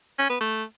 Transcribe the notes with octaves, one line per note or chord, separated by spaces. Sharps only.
C#4
B3
A3